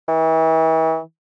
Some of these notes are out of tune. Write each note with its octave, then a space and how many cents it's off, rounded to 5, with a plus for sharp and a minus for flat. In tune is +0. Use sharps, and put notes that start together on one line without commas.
E3 -40